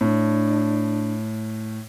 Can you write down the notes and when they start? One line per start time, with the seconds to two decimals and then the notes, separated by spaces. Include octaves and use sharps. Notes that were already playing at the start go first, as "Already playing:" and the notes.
0.01 A2 D4